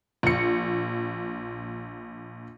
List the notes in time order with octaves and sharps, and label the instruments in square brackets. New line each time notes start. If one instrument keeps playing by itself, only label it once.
[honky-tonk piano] A#1 C#7